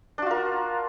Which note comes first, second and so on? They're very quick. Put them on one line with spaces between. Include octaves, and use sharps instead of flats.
D4 F#4 F4 A#4